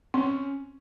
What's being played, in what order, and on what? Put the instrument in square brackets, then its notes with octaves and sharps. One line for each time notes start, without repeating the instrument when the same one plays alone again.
[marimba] C4 [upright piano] C#4